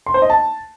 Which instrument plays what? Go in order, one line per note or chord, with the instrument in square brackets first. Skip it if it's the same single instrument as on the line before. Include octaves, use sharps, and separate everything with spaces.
[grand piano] C6
C5
D#5
A5